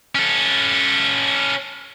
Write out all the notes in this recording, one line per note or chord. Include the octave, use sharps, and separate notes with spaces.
C#4 A4